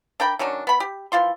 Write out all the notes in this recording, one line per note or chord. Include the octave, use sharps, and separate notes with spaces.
D4 A#4 G5 B5
D#3 F#3 C#4 D4
B3 B5
G4
E3 F3 F4 C6